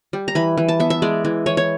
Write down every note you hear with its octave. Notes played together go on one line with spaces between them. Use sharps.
G3
A#5
E3 B5
E3
A5
B3 E5
E5
G#3 D5
E3
E3 C#5
C#5